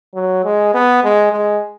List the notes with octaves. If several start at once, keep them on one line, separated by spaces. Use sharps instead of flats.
F#3
G#3
B3
G#3
G#3